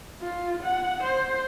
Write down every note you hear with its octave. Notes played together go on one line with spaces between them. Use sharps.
F4
F#5
C5